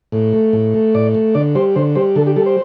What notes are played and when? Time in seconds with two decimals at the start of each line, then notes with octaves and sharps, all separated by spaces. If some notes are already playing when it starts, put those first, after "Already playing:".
0.12 A2
0.33 A3
0.53 A2
0.74 A3
0.95 A2 D5
1.15 A3
1.35 D3 D5
1.55 G3 C5
1.76 D3 C5
1.95 G3 C5
2.16 D3 A4
2.26 G4
2.36 G3 A4
2.46 C5